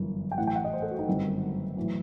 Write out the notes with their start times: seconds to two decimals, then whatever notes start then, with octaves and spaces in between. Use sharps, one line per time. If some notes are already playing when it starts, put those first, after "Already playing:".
Already playing: G1 F#2 E3
0.32 G5
0.38 A1 A2 E3 F#5
0.47 G5
0.56 F#5
0.65 D#5
0.74 C5
0.82 A4
0.91 F#4
0.99 D#4
1.08 G1 F#2 D#3 C4
1.76 B1 A2 E3